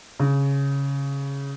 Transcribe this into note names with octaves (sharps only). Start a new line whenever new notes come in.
C#3